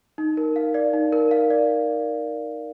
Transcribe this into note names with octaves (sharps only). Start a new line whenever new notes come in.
D#4
A#4
F5
D5
D#4
A#4
F5
D5